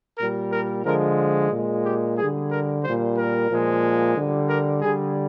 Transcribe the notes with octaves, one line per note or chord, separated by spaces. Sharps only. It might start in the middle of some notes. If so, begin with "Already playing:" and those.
A#2 G3 A#4
A#4
D3 F3 G#3 A#4
A#2 G#3
G4
D3 G3 G#4
A#4
A#2 G3 C5
A#4
A#2 F3 G#3
D3 G3
A#4
D3 G3 G#4